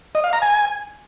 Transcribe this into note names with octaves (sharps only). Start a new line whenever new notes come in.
D#5
F5
A#5
G#5